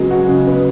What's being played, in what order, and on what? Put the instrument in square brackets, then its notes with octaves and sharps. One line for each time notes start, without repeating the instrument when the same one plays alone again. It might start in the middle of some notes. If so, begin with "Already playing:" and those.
Already playing: [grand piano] C#3 F#3 B3 [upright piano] G#3
[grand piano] F#4
C#3
B3